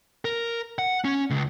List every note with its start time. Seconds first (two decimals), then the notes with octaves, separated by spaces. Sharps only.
0.25 A#4
0.79 F#5
1.05 C#4
1.30 C#2